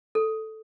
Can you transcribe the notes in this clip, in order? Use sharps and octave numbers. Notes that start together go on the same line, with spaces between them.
A4